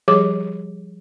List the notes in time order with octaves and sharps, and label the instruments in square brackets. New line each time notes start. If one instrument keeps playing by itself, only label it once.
[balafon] F3 G3 G4 G#4 C#5 D6